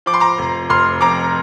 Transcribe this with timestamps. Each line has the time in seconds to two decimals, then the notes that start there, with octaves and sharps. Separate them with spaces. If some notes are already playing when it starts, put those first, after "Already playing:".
0.06 F3 D6
0.14 C6
0.20 A#5 D6
0.38 F1
0.70 F1 C6 F6
1.01 F2 A#5 D6